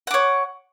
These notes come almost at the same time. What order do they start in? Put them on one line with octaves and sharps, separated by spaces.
F#5 D6 C#5